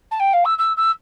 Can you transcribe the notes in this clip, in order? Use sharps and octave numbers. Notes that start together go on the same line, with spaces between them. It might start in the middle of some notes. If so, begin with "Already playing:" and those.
A5
G5
F5
E6
E6
E6